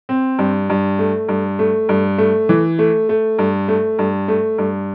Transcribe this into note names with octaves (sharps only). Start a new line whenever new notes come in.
C4
G2
G2
A3
G2
A3
G2
A3
E3
A3
A3
G2
A3
G2
A3
G2